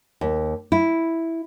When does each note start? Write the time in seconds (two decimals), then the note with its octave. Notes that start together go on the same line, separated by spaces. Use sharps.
0.21 D#2
0.72 E4